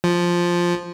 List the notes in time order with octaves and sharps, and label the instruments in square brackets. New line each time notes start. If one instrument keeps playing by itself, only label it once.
[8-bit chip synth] F3